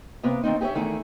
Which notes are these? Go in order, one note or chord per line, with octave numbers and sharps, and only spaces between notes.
C3 A#3 B3
D#3 A#3 C4 D#4
G4 G#4 A#4 C#5 E5
E2 D#3 A3 E4 G#4